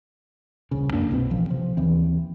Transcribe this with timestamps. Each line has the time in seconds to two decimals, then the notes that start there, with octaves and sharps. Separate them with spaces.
0.71 D#1 C2 C#3
0.93 F#2 A#3 D4
1.11 C2 B2 B3 C4
1.30 A1 F3
1.50 C3 F3
1.77 D#2 E3 C4